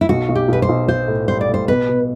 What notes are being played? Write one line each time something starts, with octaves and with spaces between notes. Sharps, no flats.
E4
B1 F#4
B1
G4
B1 B4
C5
B1
B1 C5
A2
G3 C5
D5
A2
C5
B2 B4
B2